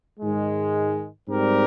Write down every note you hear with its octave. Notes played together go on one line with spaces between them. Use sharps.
G#2 D#3 G#3
G#2 G3 C4 G4 A#4